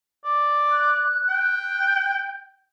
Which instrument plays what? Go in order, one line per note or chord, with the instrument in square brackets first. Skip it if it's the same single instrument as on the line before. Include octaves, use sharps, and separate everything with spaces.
[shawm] D5
[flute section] F#6
[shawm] G5